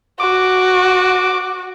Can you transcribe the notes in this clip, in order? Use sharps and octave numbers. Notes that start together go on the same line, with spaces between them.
F#4 D6